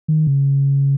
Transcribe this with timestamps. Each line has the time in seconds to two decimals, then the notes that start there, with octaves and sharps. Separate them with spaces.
0.08 D#3
0.27 C#3